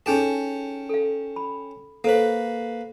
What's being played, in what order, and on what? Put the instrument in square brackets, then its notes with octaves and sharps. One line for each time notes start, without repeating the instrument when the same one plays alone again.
[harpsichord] C#4 G5 A5 [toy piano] D#4 G#4 A4
[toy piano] A4 F5
B5
[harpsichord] A#3 B4 [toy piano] A4 C5